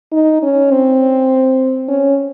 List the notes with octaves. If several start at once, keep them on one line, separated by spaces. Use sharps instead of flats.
D#4
C#4
C4
C#4